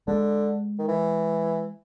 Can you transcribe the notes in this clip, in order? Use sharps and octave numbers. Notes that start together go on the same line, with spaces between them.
D3 G#3
D#3
E3